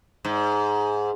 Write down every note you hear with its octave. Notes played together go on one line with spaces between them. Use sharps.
G#2